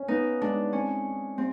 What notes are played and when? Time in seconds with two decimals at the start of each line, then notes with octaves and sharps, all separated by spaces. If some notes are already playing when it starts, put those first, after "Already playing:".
Already playing: C#4
0.08 B3 D#4
0.41 G#3 D4
0.73 C4 C#4
1.06 D#4
1.37 G3 C4